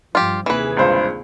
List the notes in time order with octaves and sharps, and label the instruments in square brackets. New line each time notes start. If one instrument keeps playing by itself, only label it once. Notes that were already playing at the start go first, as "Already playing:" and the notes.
[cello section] G2 F3 [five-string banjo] F4 G4
[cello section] D#2 C3 G#4 [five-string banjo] E3 B4
[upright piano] C#2 G2 C5